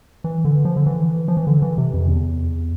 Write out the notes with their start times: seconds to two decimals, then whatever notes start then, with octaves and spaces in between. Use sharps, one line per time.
0.24 E3
0.45 D3
0.65 F3
0.77 D3
0.86 E3
1.28 F3
1.37 E3
1.47 D3
1.62 E3
1.78 C3
1.94 F2
2.08 E2